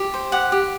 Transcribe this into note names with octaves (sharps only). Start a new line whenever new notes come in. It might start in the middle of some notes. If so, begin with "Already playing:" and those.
Already playing: G4
C5
G4 F#5
G4